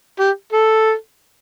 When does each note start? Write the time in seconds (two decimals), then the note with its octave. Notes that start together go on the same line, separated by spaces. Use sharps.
0.20 G4
0.53 A4